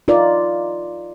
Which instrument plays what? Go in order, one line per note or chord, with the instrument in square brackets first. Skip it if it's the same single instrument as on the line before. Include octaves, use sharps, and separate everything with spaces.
[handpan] D#4 F4 A#4 D5